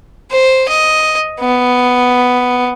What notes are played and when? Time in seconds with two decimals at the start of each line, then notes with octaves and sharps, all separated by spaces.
0.31 C5
0.68 D#5
1.40 B3